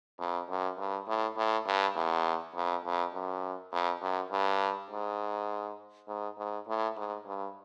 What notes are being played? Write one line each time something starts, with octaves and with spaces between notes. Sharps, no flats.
F2
F#2
G2
A2
A2
G2
E2
F2
F2
F#2
F2
F#2
G2
G#2
G#2
G#2
A2
G#2
G2